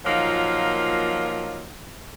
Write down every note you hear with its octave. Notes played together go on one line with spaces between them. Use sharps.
A#2 F3 F#3 A#3 D#4 F4